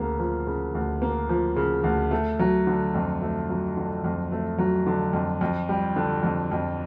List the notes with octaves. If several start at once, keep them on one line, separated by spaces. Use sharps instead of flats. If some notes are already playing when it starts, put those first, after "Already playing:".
Already playing: D2 C#3 A#3
F3
C#3
D2
A#3
F3
C#3
D2
A3
F#3
D3
F2
A3
F#3
D3
F2
A3
F#3
D3
F2
F2
G3
D3
F2
F2